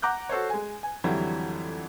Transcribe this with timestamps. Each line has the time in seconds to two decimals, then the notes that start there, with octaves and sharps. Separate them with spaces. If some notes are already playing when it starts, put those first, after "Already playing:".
0.02 F#5 A#5 D6 F#6 G6
0.29 F#4 A4 C5 C#5
0.50 G#3 G#5
0.83 G#5
1.04 F2 D3 E3 F#3 G3